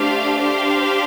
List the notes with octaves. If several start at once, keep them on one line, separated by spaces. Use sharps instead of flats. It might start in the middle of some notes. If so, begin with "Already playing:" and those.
Already playing: A3 D4 G4 C5 F5
D4 G4 C5 F5